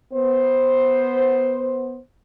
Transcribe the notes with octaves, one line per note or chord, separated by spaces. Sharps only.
B3 C5